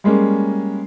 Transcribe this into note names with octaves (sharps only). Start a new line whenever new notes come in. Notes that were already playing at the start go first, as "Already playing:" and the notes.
G3 G#3 A#3 C#4